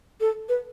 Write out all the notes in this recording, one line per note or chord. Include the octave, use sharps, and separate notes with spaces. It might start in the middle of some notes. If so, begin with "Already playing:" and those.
A4
B4